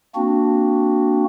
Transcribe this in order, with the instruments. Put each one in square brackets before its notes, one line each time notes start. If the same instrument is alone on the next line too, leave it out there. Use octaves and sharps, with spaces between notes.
[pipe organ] A#3 C4 D4 F#4